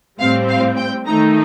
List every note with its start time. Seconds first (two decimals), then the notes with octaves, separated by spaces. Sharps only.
0.19 A2 G3 C4 F5
0.49 F5
0.77 G5
1.06 D#3 A3 D#4 A#5